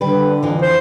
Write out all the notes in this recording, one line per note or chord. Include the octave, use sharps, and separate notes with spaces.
D3 G3 B4
F2 E3 F3
C5